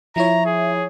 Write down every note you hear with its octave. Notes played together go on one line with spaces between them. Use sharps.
F3 E4 C#5 E5 A#5
G#4